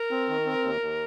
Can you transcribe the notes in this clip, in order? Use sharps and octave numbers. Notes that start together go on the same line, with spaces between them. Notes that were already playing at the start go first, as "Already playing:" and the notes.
Already playing: A#4
C4
D#3
C4
D#2
D#2